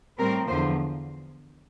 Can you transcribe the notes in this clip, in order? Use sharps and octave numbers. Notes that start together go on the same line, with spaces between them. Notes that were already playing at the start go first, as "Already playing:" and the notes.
A2 G3 C4 A#4
E2 D3 F3 C5